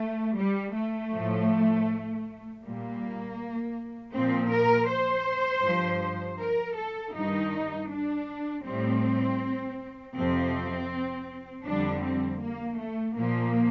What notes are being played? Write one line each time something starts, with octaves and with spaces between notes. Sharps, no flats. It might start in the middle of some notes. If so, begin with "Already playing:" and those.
Already playing: A3
G3
A3
A2 F3
A#2 G3 A#3
A#2 F3 C4
A#4
C5
G2 F3
A#4
A4
G2 D#3 G3 D#4
D4
A2 G3 C4
F2 C3 F3 C4
F2 D3 G3 D4
C4
A#3
A3
A#2 F3 A#3